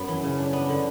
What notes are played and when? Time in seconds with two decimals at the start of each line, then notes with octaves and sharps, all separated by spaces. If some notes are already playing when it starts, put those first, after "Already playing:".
Already playing: F#2 B3 F#5
0.08 E3
0.23 C#3
0.39 D4
0.53 B3
0.69 D3